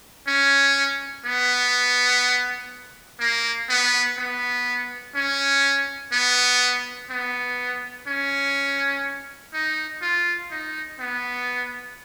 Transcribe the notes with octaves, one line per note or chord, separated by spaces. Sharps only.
C#4
B3
A#3
B3
B3
C#4
B3
B3
C#4
D#4
F4
D#4
B3